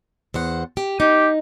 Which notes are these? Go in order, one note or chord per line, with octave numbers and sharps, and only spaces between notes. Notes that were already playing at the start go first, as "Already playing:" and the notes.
E2 C5 F#5
G4
D#4 G4